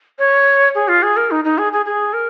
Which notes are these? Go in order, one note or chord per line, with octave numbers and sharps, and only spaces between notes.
C#5
G#4
F4
G#4
A#4
D#4
D#4
G#4
G#4
G#4
A#4